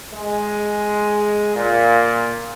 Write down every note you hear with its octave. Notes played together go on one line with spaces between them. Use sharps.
G#3
A#2